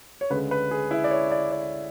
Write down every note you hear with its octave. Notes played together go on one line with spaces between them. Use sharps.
C#5
D2 C#3 G#3 B4
B4
G#4
E4
D5
C#5
D5
D5